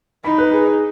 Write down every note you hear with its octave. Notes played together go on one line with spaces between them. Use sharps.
D#4 B5
B4
G#4